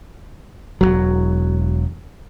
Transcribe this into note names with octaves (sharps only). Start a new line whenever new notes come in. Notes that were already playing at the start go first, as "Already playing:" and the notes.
E1 D#2 F#3